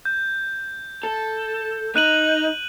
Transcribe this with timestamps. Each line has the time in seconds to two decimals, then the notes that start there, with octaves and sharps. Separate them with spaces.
0.05 G6
1.03 A4
1.96 D#4 F#6 D#7 F#7